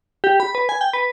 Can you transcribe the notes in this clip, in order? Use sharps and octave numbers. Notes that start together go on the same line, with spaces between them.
G4
B5
B4
G#5
G5
B4